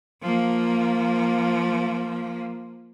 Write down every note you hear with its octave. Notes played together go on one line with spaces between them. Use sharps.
F3 A#3